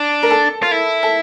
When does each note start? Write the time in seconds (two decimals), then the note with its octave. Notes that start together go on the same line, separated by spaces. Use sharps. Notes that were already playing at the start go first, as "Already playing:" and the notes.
Already playing: D4
0.23 A#4
0.31 A4
0.63 F4
0.71 E4
1.03 A4